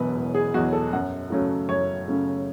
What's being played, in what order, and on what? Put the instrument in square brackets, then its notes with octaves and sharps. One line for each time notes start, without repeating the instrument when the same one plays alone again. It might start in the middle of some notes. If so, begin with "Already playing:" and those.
Already playing: [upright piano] E1 E2 B2 F#3 B4
E1
G#4
E2 B2 F#3 F#4
A4
F#2 F#5
C#3 F#3 A3 C#4
F#2 C#5
C#3 F#3 A3 C#4